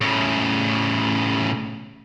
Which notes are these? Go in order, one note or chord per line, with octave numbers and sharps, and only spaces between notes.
A2 C#3